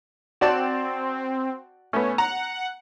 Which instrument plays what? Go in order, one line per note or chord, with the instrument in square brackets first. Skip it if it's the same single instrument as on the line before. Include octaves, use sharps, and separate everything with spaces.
[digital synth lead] C4 [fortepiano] F#4 D5 A5
[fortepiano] A3 B3 [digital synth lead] C#4
[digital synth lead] F#5 [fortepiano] A#5